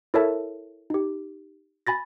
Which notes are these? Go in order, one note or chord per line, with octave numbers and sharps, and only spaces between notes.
E4 A4 A#4 C#5 E5 A5
D#4 G4
G#5 B5 A6 A#6